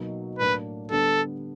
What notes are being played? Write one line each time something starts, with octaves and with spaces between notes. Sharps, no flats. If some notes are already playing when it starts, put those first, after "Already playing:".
Already playing: B2 F#3 A#3 D#4
A2 F#3 A#3 D4 B4
D3 G3 B3 D4 A4